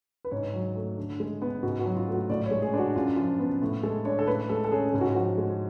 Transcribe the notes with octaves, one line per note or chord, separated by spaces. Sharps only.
B4
G#2 C#5
F#3
A3
D3
G#3
B3
G#2 F#4
F#4
F#3
F4
A3
F#4
A2 D5
C#5
G#3
G#4
D4
F#4
F#2 F4
F3 F4
B3
A2
G#3 A4
D4 C#5
A4
A2 B4
G#3 A4
A4
C#4 G#4
G#2 G#4
F#4
F4
F3 F#4
G#3